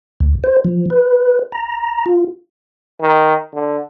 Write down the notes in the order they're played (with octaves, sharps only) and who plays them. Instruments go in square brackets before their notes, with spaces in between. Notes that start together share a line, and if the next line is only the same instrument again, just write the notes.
[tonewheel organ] D2
C5
F3
B4
A#5
F4
[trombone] D#3
D3